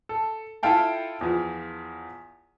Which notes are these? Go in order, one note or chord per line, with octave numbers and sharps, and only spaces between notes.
A4
E4 F4 A4 F5 G5 A5
E2 F3